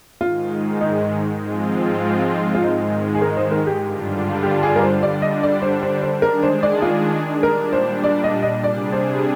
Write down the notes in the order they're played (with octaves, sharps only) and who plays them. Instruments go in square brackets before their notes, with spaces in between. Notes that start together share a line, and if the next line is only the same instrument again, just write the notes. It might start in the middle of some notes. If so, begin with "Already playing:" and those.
[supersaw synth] G#2 D#3 G#3 [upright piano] F4
[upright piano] D#4
[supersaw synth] G#2 F3 G#3 C4 F4
[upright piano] F4
[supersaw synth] G#2 D#3 G#3 [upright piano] D#4
[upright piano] G#4
A#4
C5
A#4
G4
[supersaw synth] G2 D3 G3 D4 F4
[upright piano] G4
G#4
A#4
C5
[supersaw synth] D3 G3 D4 [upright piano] D5
[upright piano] D#5
D5
C5
C5
C5
[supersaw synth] D#3 G#3 D4 G#4 [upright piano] A#4
[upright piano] C5
D5
F4
[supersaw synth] A#2 G3 D4 [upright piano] A#4
[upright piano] C5
D5
D#5
D#5
[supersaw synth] C3 G3 D4 G#4 [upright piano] D5
[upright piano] C5